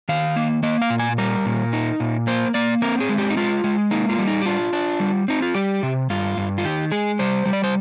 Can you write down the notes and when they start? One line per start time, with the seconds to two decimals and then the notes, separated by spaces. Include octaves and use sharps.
0.09 D#3 F5
0.36 A#3
0.63 A#3 D#5
0.82 F5
0.90 A#2
1.00 G#5
1.18 G3 A#4
1.46 A#2
1.73 D#4
2.00 A#2
2.27 A#3 C5
2.54 A#3 D5
2.82 C4 A#4
3.00 G#4
3.09 G#3
3.18 G4
3.30 D#4
3.37 G#3 F4
3.64 G#3
3.91 A#3 D#4
4.10 F4
4.18 G3
4.27 D#4
4.41 G4
4.46 D4 F4
4.73 D4
5.00 G3
5.28 C4 D#4
5.42 F4
5.54 G3 G4
5.83 C3
6.10 G2 F4
6.37 G2
6.58 F4
6.64 D#3 G4
6.91 G#3 G#4
7.19 G3 C5
7.46 G3
7.53 D5
7.64 C5